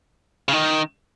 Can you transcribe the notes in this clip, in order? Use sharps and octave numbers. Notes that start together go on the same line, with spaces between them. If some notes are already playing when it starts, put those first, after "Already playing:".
C#3
D#3